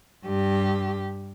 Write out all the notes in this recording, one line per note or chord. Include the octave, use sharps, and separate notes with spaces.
G2 G4